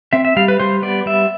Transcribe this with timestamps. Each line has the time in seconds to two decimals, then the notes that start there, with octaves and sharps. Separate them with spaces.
0.13 C4 E5
0.25 E5
0.37 G3 F5
0.48 B4
0.60 G3 C5
0.82 B3 D5
1.06 G3 E5